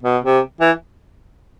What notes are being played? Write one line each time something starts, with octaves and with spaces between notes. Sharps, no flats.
B2
C3
E3